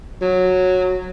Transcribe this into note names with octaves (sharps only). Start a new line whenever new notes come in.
F#3